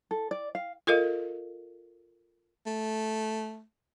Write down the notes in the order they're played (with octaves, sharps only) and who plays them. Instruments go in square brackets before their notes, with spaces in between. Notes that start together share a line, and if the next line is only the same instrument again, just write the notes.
[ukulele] A4
D5
F5
[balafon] F4 A4 A#4 D#5 F5
[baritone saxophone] A3